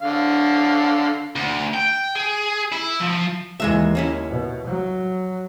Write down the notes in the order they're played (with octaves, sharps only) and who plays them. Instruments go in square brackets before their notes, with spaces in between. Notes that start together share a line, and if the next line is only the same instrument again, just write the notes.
[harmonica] D3 F5
[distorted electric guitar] D2
G5
G#4
E4
F3
[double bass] D#2 [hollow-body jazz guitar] E3 G#3 E5
[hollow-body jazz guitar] A#3 C#4 E4
[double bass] B2
F#3